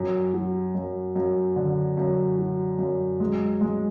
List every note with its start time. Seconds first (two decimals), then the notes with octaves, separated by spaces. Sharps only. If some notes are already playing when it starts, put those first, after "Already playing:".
Already playing: F#2
0.34 F#3
0.75 F#2
1.16 F#2
1.56 D3
1.97 F#2
2.38 F#3
2.79 F#2
3.20 G#3
3.61 G#3